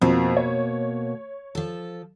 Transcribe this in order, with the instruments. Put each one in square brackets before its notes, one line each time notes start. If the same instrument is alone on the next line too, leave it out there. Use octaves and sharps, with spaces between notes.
[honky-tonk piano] F2 [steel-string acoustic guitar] B2 A#3
[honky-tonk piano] C#5
[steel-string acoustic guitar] F3 A4